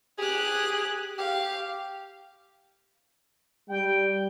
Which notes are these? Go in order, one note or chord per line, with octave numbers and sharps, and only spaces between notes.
G4 G#4 F#6
G4 F5
G3 G5